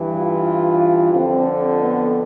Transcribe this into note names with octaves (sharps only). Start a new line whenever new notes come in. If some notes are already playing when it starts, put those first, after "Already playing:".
Already playing: G2 E3
F4
F2 D3 C4
C4
B3